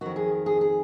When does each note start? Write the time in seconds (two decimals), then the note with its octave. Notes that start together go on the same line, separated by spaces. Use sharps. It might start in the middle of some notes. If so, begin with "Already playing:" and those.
0.01 F2 D#3 F#4
0.16 G#4
0.46 G#4
0.61 G#4